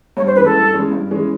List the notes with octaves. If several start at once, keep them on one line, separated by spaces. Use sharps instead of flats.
G2 C#5
C5
E3 G#3 C#4 B4
A4
G2
E3 G#3 C#4
G2
E3 G#3 C#4